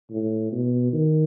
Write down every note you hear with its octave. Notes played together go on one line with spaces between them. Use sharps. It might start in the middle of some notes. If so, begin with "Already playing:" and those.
A2
B2
D#3